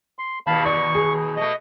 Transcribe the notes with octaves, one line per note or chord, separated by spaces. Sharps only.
C6
D#2 B2 F5 A5 B5
D5 C#6
G#4
B2 A3 D#5